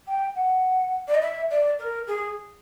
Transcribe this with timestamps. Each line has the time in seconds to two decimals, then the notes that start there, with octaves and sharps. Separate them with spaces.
0.07 G5
0.35 F#5
1.08 D5
1.15 D#5
1.21 E5
1.51 D5
1.79 A#4
2.07 G#4